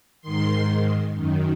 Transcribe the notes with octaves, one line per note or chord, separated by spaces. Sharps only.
G#2 D#3 C6
F#2 D#3